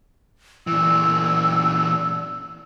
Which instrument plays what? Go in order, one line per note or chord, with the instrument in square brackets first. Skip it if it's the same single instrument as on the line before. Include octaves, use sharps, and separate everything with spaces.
[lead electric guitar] A#2 E3 [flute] E6